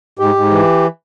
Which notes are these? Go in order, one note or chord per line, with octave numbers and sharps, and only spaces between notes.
G#2 G4
G#2
E3